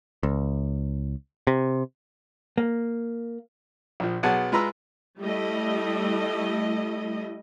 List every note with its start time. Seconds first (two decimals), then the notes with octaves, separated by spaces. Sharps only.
0.23 C#2
1.47 C3
2.58 A#3
4.00 A#1 F3
4.23 B1 B3 G#4 F#5 G#5 A5
4.52 G#3 F4 B4 A#5 E6
5.18 G3 A3 E4 D#5